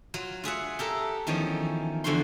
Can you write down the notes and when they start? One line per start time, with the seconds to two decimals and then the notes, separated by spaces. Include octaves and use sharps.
0.14 F#3 F4
0.44 F4 G#4 E5 F#5
0.79 G4 A4 A#4 E5
1.27 E2 D#3 F3 C#4 D#4
2.04 E2 D3 F3 F#4 F#5 C6